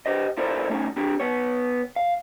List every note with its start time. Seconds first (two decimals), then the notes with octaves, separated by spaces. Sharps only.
0.06 G4 C5 D#5
0.37 E4 F4 A4 A#4 C5 D5
0.70 A3 C#4 D#4
0.96 C4 D4 G4
1.20 B3 C#5
1.96 F5